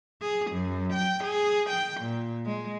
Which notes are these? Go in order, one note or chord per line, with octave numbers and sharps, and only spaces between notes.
G#4
F#2
G5
G#4
G5
A#2
G#3